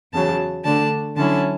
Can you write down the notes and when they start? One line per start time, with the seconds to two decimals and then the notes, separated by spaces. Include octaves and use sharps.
0.13 E2 C#3 F#3 A5
0.64 D3 A3 D4 A5
1.16 D3 F#3 C#4 E4 A5